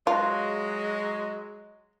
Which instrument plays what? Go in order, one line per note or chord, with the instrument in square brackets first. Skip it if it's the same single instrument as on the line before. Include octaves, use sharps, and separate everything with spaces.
[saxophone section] F#3 G#3 [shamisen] F4